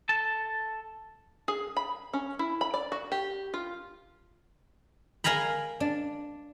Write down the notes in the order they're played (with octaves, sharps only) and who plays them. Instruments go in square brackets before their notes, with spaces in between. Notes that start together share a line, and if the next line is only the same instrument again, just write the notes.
[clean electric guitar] A4 A5
[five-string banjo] G#4
B5
C#4
E4
B5
D5
F#4
G4
F4
[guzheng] A#4 F5 G#5 A#5 B5
D4